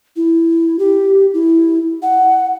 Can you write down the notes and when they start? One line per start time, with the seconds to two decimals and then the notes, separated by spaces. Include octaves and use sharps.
0.16 E4
0.79 G4
1.34 E4
2.02 F#5